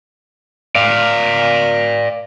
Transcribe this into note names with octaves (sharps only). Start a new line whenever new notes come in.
D5 F5